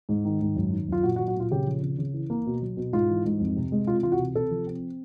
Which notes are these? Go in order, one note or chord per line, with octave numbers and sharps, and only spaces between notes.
G#2
D#3
G#2
F#2
D#3
F#2 F4
A#2 F#4
F#4
F#3
F#4
A#2 F4
C#3 G4
F3
C#3
C#3
E3
A#3
B2
F#3
B2
G#2 F4
E3
G#2
F2
C3
G#3
C3 F4
E3 F4
F#4
C3
C3 A4
F3
C4